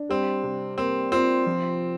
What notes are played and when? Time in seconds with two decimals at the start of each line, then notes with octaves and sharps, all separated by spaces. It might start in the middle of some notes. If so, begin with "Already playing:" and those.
Already playing: D4
0.09 G3 C4
0.44 C3
0.78 A#3 C4
1.12 C4 F4
1.46 F3